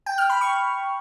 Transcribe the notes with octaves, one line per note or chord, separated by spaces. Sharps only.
G5
F6
B5
C#6